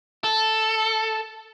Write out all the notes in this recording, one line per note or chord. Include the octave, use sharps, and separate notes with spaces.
A4